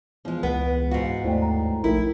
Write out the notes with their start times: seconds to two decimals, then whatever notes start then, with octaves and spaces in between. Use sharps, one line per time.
0.25 E2 F3 G#3
0.43 C#2 B3
0.91 G#2 F#4 F5 C7
1.24 D#2 A2 C5 D5 G5
1.42 A#5
1.84 A#1 A2 D#4 E4 A#4